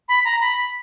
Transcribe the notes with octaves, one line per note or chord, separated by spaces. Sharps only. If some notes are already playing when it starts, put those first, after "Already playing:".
B5
A#5
B5